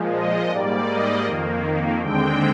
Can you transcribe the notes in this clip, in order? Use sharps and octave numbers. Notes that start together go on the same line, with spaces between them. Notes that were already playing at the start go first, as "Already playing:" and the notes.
Already playing: A#2 F3 G#3
D#5
G#2 G3 A#3 D5
D#5
F2 D#3 A#3
D#2 D3 G#3 C4 G5